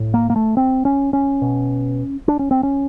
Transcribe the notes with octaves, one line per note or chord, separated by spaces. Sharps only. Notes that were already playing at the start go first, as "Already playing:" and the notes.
Already playing: A2
A#3
A#3
A3
C4
C#4
C#4
B2
D4
C#4
C4
C#4